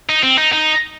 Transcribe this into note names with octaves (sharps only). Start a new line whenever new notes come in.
D#4
C4
D#4
D#4